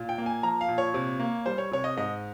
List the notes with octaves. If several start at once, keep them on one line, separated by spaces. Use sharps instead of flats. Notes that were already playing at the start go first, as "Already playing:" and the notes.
Already playing: A#2
G5
A#3
G#5
F3 A#5
F5
A#2
C#5
C3
A#3
G3 C5
C#5
C3 C#5
D#5
G#2 D#5